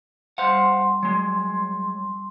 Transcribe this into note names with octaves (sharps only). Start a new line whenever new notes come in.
G3 C5 F5 F#5 C6
F#3 G#3